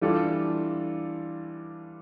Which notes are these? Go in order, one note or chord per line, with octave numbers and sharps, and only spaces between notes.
E3 G3 D4 F4 A4